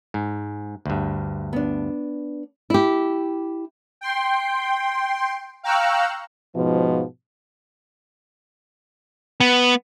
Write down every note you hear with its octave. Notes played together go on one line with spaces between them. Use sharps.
G#2
D2 G2
B3 D4
E4 G4
G5 C6
F5 G5 A#5 C#6 E6 F#6
G#2 B2 F3
B3